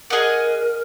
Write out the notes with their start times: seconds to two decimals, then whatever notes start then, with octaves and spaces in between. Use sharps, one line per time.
0.10 G#4 A#4 D#5 F#5